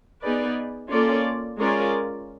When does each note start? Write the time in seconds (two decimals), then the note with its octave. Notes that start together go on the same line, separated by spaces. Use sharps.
0.22 B3 D#4 G#4 B4 D5
0.91 A#3 C#4 F4 A4 D5
1.60 G#3 C#4 F4 A#4 D5